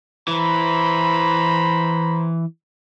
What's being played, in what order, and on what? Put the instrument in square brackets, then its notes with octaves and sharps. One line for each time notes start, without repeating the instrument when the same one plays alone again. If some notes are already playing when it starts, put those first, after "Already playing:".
[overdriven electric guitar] E3 [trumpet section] C5 A#5 B5